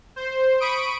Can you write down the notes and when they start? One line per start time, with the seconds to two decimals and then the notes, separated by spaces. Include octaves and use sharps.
0.16 C5
0.60 B5 C#6 D#6 D7